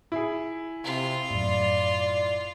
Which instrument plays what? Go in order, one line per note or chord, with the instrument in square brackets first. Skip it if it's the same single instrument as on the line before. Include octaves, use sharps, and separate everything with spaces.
[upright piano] E4 G#4
[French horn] C3 [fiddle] F4
[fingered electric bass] F#2 A2 [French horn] D5